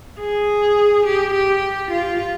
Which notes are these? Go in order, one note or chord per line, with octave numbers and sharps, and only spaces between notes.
G#4
G4
G4
F4